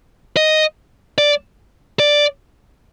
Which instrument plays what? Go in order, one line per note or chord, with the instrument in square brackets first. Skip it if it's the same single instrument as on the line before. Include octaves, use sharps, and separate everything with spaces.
[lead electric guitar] D#5
D5
D5